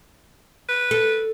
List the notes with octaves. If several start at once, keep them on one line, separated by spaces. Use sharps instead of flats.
B4
A4